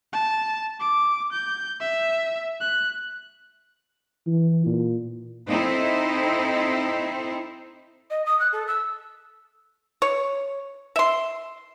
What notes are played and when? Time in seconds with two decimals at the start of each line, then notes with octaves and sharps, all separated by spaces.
0.13 A5
0.80 D6
1.32 G6
1.80 E5
2.60 F#6
4.27 E3
4.66 A#2
5.48 C4 D#4 E4 A4 C5
8.10 D#5
8.25 D#6
8.39 F#6
8.52 A4
8.67 E6
10.02 C#5
10.96 E5 C6